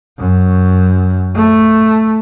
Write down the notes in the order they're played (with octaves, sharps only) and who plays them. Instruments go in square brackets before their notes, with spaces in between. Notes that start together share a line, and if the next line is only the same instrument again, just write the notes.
[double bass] F#2
A3